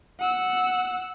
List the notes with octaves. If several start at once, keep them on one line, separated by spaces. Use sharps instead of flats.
F#5 E6